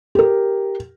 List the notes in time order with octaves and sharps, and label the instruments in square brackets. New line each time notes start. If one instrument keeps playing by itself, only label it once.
[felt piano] G4 A#4